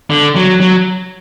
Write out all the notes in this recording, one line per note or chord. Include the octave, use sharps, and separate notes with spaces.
D3
F#3
F#3